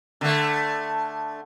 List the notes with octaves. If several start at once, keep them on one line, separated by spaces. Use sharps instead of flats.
D3 A3